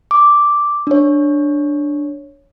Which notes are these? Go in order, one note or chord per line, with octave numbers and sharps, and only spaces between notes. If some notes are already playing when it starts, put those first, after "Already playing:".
D6
D4 C#5